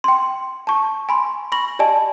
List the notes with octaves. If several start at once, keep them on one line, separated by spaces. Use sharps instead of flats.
G5 C6
A5 C#6
G#5 B5 C6
B5 C#6 A#6 F#7
G4 D5 D#5 G#5 A5